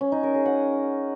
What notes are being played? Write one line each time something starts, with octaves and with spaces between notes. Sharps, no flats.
C#4
D#4
A#4
G#4
F#5